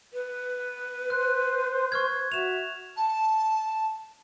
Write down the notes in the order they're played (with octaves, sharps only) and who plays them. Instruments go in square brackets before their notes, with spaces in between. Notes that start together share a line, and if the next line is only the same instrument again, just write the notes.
[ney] B4
[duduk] C5 [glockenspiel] F#6
[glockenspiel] C#6 F6 G#6
[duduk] F#4 [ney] E5 [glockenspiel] E7 F7
[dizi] A5